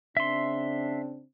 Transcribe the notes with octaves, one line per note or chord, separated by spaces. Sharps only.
C#3 C4 D4 E5 C6